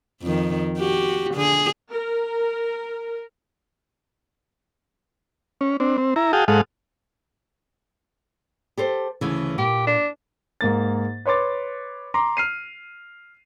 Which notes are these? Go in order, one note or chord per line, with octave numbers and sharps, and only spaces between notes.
F2 D#3
F#4 G4
D3 G#4
A#4
C#4
C4 D4
C4
E4 A#5
F#4 G#4 F5 G5 A5 D#6
G#2 G#3 A4 F5 F#5 D#6
G4 A4 C5
D2 C#3 E3
A#2 G4
D4
G#2 A#3 A6
B4 C#5 C6 D6 A6
A#5 C6 D6
F6 C7 D#7